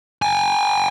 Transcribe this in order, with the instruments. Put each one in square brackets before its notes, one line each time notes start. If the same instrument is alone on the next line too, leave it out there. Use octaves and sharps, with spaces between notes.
[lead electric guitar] G5 G#5